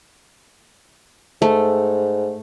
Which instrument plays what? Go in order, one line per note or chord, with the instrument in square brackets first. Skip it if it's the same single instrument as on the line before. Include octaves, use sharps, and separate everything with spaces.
[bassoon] G#2 [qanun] A3